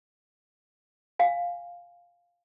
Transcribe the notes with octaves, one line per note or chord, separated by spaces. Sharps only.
F5 G#5